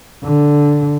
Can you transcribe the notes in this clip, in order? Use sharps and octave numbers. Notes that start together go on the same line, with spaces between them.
D3